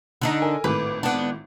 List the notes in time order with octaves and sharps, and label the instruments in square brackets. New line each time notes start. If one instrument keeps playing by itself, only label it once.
[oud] D3 D4 D#4
[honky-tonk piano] A#4 G#5
[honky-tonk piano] G#1 A2 D6 [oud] B4
[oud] B3 D4